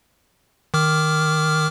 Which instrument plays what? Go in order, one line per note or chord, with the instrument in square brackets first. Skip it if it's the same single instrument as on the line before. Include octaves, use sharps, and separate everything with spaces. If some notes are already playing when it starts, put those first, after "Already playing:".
[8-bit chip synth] D#3 D6 F6